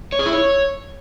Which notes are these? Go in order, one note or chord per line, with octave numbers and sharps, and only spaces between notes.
C#5
G#4
E4
C#5